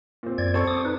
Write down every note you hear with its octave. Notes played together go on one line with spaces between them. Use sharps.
A#2 C4
F#2 D5 G#6
C4 A4 C#6
D6 D#6
D#4 B4